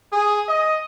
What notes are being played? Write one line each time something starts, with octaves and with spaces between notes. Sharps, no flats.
G#4
D#5